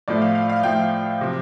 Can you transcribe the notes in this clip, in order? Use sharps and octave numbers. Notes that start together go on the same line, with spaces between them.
A2 F3 A3 D5
F5
F5
F5
A2 F3 A3 G5
C3 F3